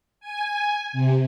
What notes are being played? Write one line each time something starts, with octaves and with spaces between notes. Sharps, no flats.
G#5
C3